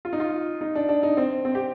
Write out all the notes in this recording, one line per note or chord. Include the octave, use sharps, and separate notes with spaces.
F4
D#4
F4
D#4
D4
D4
D#4
C4
C4
G4